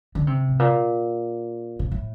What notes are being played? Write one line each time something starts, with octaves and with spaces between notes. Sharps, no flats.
D3
C3
A2
A#2
A#2
A2